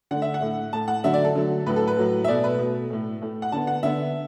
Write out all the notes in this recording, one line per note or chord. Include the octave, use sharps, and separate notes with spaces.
D3 A3 F#5
E5
F#5
A2 A3
A2 A3 A5
F#5
D3 F#3 A3 E5
D5
A4
D3 F#3 A3
A2 F#3 A3 B4
A4
B4
A2 F#3 A3
E5
B2 A3 D5
B4
B2 A3
A2 A3
A2 A3
F#5
D3 B3 A5
F#5
D3 B3 E5